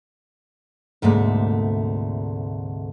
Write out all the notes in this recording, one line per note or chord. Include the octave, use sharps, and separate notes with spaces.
D2 G#2 C3 A3 A#3